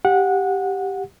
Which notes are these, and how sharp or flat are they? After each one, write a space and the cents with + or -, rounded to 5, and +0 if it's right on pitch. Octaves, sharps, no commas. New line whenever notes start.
G4 +0 F#5 -20